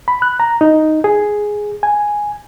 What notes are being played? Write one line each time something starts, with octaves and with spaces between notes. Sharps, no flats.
B5
F#6
A#5
D#4
G#4
G#5